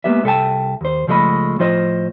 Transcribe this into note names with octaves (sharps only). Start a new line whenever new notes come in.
G#3 A#3 B3 G4 E5
C2 A4 E5 F5 G5 A5
D#2 C5
C#2 F3 G#3 A3 D#5 B5
A2 F3 F4 C5 D#5